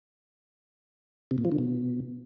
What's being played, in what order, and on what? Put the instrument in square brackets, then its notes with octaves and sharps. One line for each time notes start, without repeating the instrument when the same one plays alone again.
[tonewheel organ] C3
A#2
F3
D3
B2